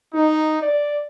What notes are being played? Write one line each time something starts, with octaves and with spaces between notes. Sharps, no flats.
D#4
D5